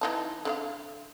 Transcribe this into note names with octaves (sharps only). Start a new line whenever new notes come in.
E3 D#4 A5
D3 D#4 F5